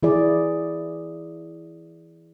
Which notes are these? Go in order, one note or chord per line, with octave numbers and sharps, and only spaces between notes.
E3 E4 G#4 D5